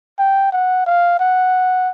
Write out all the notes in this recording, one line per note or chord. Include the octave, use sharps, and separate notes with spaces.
G5
F#5
F5
F#5